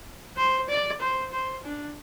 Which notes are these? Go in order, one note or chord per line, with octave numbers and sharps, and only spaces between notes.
C5
D5
C5
C5
D4